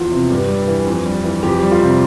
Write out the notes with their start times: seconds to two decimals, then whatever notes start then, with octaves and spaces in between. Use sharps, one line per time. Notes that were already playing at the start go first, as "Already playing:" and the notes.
Already playing: E2 F3 F4
0.12 C3
0.30 G2 G4
0.48 G3
0.68 E3
0.86 F2
1.06 G3
1.24 E3
1.43 F2 G4
1.63 G3
1.71 F4
1.81 C3